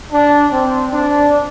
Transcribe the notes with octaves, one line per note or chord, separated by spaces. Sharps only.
D4
C4
D4